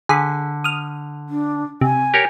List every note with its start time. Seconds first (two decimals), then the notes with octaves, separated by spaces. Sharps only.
0.09 D3 G#4 B5
0.64 D#6 F6
1.29 D4
1.81 C3 G#5
2.14 G4 A#4 C#5